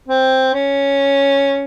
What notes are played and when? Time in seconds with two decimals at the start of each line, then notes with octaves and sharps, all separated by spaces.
0.08 C4
0.54 C#4